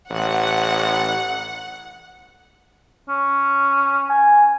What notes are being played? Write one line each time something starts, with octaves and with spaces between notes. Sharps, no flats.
A1 F#5
C#4
G#5